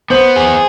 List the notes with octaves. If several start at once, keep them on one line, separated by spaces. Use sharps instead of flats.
B3 C5
G#4